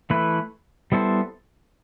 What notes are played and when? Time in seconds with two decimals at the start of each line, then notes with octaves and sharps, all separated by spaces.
0.10 E3 A3 E4 B4
0.92 G3 B3 E4 A4 C5